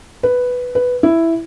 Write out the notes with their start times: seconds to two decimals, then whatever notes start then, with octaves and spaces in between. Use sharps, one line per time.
0.23 B4
0.75 B4
1.03 E4